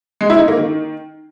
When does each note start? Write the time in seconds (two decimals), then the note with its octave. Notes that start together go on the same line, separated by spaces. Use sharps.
0.21 G#3
0.30 E4
0.39 D#4
0.48 A#3
0.57 D#3